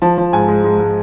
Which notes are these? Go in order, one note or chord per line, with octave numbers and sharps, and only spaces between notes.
F3 A5
F3
G#2 G#5
G#3
G#3
G#3